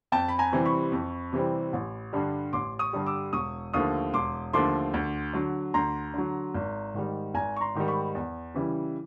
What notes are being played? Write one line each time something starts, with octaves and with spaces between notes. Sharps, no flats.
F2 G5 A5
B5
G#5 A#5
C3 E3 G3 C4
B5 C#6
F2
C3 E3 G3 C4
A1
G2 D3 G3
A1 C6 D6
C#6 D#6
G2 D3 G3
D6 E6
E1 C#6 D#6
D#2 D3 F3 A3 C#6 D#6
E1 C6 D6
D#2 D3 F3 A3 C6 D6
D2
D3 F#3
D2 A#5 C6
D3 F#3
G#1
G#2 D#3 G3
G#1 G#5 A#5
C#6
A#5 C6
G#2 D#3 G3
B5 C#6
E2
C#3 E3 G3